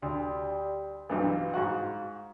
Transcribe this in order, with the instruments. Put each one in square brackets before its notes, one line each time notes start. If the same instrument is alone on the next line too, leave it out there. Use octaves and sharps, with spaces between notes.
[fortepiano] D2 [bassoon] G3
[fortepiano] B1 G2 E3 [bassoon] F4
[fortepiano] G#2 F#4 F#5